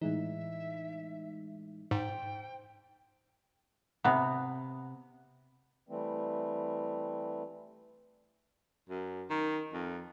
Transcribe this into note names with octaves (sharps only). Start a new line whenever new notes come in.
A2 E3 G#3 D#4 E5
G#2 C5 G5
C3 B3
E3 G3 A3 C4
F#2
D#3
F2